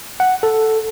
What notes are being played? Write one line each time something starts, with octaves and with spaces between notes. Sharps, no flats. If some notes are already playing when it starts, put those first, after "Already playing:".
F#5
A4